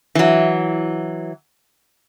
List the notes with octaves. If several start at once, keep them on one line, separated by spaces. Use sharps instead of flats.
E3 F#3